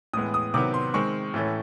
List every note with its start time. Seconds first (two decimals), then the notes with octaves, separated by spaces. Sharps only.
0.13 A2 E3 G#3 B3 D#6
0.34 D#6
0.54 C3 D#3 F#3 B3 D6
0.74 C6
0.94 D#3 G#3 C4 C#6
1.34 A2 E3 A3 C#4